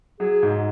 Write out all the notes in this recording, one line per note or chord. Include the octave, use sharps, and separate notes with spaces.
F#3 G#4
G#2